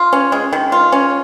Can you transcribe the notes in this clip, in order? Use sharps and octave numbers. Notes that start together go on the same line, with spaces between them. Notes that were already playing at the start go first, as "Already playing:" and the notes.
Already playing: F4
C#4
G#3
D#3
F4
C#4